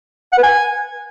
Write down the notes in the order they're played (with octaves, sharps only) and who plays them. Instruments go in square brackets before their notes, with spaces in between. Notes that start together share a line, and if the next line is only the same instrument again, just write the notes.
[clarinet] F#5
B4
G#5